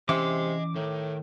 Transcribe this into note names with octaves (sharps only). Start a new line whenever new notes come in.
C3 E3 C#4 D#5 E5 G#5 D6
A2 D#3